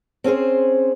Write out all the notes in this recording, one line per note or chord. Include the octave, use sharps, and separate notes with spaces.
C4 C#4 G#4 C5